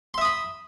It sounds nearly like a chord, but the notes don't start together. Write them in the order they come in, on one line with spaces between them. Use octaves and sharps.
C6 E5 D#6 B5